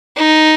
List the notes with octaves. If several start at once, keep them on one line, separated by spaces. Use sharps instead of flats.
D#4